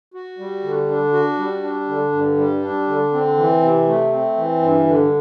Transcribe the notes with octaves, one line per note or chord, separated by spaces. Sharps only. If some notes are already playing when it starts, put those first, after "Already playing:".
F#4
G3
D3
D4
F#4
G3
D4
D3
G2
G3
D4
D3
C4
E3
C3
A3
C4
E3
G2
D3